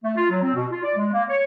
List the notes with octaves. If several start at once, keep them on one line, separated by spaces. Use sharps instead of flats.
A3
F4
F#3
C4
B2
F4
D5
G#3
A#3
C#5